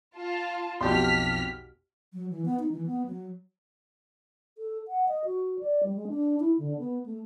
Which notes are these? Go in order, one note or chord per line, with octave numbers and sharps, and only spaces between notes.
F4 A5
B1 F2 B2 G4 C6 F6 B6
F#3
E3
B3
D#4
E3
B3
F#3
A4
F#5
D#5
F#4
D5
G3
G#3
D4
E4
D3
B3
A3